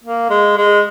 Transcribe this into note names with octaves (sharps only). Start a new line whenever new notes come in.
A#3
G#3
G#3